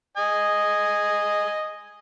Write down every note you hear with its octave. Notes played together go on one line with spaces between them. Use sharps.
D#5 G#5